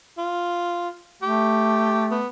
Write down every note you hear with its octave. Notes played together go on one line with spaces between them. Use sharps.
F4
A3 G4
B3